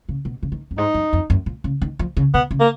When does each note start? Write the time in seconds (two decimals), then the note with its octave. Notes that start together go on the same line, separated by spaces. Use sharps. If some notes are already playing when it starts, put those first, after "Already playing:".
0.09 C#3
0.25 B2
0.43 C#3
0.52 D#3
0.71 F#2
0.78 G#2 D#4
0.94 F#2
1.13 F2
1.30 F#2
1.46 A#2
1.64 C#3
1.82 D#3
1.99 F3
2.17 C#3
2.34 B2 B3
2.51 C#3
2.60 A#3